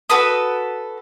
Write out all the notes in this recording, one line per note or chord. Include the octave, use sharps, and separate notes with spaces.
F#4 A4 B4 D#6